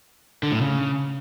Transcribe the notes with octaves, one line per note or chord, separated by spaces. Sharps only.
D3
A2
C#3